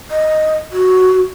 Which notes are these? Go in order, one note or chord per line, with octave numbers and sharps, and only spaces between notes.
D#5
F#4